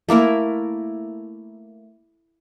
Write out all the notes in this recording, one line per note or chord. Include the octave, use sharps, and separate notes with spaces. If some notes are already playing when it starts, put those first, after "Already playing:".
A3 A#3 E4 A#4